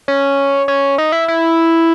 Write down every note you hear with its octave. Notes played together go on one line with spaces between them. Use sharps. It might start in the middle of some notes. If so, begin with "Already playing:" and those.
C#4
C#4
D#4
E4
E4